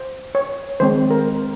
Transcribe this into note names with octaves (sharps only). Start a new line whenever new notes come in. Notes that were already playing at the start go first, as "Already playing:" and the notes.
Already playing: C5
C#5
D#3 G#3 C4 C5
A#4